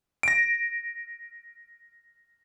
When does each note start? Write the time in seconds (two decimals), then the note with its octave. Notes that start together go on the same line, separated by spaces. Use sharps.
0.23 A#6 D7